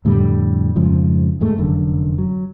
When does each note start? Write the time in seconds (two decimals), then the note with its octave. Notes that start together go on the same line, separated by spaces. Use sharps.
0.05 F2 A2 D3 G3
0.76 F2 G#2 C#3 F3
1.40 D#2 G#2 G#3 A3
1.58 F1 F#2 D3
2.18 F#3